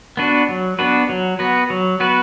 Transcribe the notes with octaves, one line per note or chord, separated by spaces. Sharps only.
B3 D4 F#4 B4
F#3
B3 D4 F#4 B4
F#3
B3 F#4 B4
F#3
B3 F#4 B4